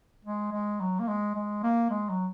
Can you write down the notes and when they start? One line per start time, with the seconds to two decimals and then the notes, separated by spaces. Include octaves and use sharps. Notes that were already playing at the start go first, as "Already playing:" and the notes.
0.25 G#3
0.52 G#3
0.80 F#3
0.99 A#3
1.08 G#3
1.35 G#3
1.63 A#3
1.90 G#3
2.09 F#3